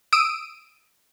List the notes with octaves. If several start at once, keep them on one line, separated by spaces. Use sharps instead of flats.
D#6 E6 D7 D#7